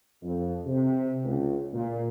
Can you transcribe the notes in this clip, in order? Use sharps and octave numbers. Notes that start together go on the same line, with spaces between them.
F2
C3
C#2
A#2